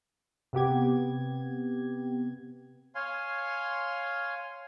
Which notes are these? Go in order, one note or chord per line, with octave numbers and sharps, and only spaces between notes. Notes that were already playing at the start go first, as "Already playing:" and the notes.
C3 B3 G4 G#6
C#5 F5 G#5 C6